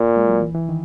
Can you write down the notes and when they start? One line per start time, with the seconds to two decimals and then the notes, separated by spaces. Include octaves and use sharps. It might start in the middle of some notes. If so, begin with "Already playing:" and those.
Already playing: A#2
0.17 G#3
0.29 F#3
0.41 E3
0.55 E3
0.69 D#3